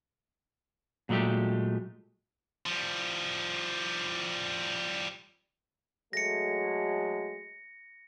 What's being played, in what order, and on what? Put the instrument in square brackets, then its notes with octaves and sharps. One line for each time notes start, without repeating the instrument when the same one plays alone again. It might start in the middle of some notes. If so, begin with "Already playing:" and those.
[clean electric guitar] A#2 F#3 G#3 A3 G4
[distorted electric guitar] F3 G3
[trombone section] F#3 G#3 A3 [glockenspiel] A#6 C#7